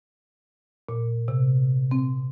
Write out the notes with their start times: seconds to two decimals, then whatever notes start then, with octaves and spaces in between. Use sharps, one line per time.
0.89 A#2
1.28 C3
1.91 C4